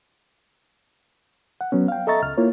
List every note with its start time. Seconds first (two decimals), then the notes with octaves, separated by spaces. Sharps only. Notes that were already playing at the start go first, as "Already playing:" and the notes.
1.61 F#5
1.72 F#3 B3 C#4
1.88 F5 G5
2.07 A4 D#5 E5 A#5 C#6 A6
2.22 C#2 F6
2.37 A#3 E4 F4 C#5